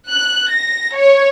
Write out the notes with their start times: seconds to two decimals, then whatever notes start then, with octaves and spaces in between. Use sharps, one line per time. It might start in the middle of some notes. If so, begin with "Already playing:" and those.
0.12 F#6
0.54 A#6
0.96 C#5